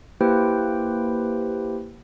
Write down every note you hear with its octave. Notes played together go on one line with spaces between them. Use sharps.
A#3 E4 G4 B4 C5 G5